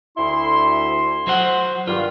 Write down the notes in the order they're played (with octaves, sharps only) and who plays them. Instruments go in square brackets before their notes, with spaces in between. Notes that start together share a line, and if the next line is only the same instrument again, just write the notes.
[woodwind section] D2 E4 C6
[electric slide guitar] F#3 C5 F#5
[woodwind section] G2 D#3 [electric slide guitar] F4